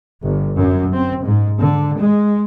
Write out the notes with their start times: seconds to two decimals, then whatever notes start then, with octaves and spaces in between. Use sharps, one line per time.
0.22 G1
0.58 F#2
0.94 C4
1.24 G#2
1.59 D3
1.99 G#3